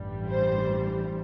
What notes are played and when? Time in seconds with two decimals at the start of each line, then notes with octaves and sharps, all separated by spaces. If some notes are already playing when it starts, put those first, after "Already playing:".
Already playing: A1 G2 E3 G3
0.29 C5